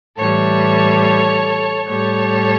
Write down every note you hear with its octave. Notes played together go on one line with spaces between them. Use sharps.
A2 E3 G3 A4 C#5
A2 G3 A4 C#5